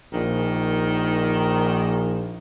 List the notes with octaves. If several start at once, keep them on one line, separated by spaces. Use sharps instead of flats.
A#1 D#3